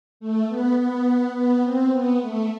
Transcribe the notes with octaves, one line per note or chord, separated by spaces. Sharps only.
A3
B3
B3
B3
C4
B3
A3